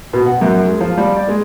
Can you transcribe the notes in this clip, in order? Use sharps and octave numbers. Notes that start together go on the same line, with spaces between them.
B2
F#5
F#2
G#3
F3
G3
D5
G#3